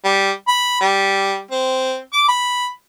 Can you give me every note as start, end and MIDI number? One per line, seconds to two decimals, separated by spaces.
0.04 0.31 55
0.48 0.76 83
0.81 1.40 55
1.51 1.97 60
2.13 2.24 86
2.28 2.67 83